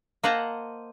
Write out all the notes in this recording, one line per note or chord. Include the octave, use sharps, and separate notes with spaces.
A#3 C5 D#5 F#5 A5 A#5